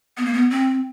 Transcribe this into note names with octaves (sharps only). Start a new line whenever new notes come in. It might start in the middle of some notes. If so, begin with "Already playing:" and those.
B3
A#3
B3
C4